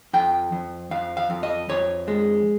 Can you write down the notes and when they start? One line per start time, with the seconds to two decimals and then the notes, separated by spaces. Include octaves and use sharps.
0.13 F2 G5
0.52 F2
0.91 F2 F5
1.17 F5
1.30 F2
1.43 D#5
1.69 F2 C#5
2.08 G#3